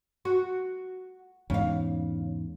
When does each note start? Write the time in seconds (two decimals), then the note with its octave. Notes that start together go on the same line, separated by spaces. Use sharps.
0.25 F#4
1.50 E2 G#2 C#3 F5